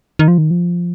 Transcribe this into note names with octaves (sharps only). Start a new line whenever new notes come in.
D#3
F3
D#3
F3